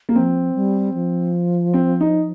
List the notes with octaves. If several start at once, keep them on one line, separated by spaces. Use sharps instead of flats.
A#3
F3 C4
G3
F3
C4
D#4